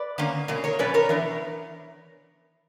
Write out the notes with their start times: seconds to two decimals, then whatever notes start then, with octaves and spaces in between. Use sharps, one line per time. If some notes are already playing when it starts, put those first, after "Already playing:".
Already playing: B4 D5
0.18 D3 A#3 C#4
0.48 B2 A#3 C#4
0.64 A#4 C#5
0.79 B2 F#3 C#4 B4 D5
0.94 A#4 C#5
1.09 E3 B3 D4